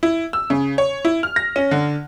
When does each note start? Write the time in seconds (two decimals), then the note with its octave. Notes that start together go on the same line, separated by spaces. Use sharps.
0.03 E4
0.33 E6
0.50 C#3
0.78 C#5
1.05 E4
1.23 F6
1.36 A#6
1.56 C#4
1.71 D3